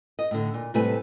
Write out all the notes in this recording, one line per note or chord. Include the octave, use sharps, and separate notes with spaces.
D#5
A2 D3
A#2
A2 C3 G3 A3 B4 G#5